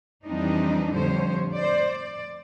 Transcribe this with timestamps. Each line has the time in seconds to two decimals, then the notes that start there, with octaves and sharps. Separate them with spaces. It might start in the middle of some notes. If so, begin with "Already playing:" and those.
0.24 F2 E3 G3 C4 D4 D#4
0.91 F2 A2 D3 G3 C5 C#5
1.56 C5 D5
1.90 D5